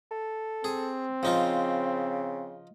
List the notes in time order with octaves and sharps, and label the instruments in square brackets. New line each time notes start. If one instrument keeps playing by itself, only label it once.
[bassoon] A4
[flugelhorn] C4 [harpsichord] G#4
[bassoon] C#3 [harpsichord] F3 D#4 F4